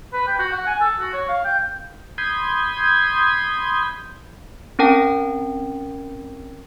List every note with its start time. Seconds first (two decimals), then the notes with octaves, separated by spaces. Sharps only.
0.13 B4
0.27 G5
0.39 F#4
0.53 F#5
0.67 G#5
0.81 A4
1.00 F#4
1.14 C#5
1.29 F5
1.45 G5
2.18 B5 C6 D#6 G6 G#6
4.79 C4 C#4 A#4 G5 A5